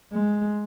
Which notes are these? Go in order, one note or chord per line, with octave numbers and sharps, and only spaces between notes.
G#3